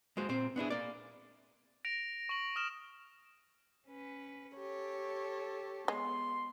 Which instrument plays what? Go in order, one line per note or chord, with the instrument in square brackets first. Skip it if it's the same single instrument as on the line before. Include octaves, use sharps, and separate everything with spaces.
[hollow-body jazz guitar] G#3 A#3 F#4 C5
A#2 C4 C5
B3 D4 E4 G#4
A#3 D5
[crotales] A#6 D7 F7
C#6 F#7
D#6 F6 E7
[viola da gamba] C#4 B4
[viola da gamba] G4 [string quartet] A4 C#5
[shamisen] G#3 [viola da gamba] B3 [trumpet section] C6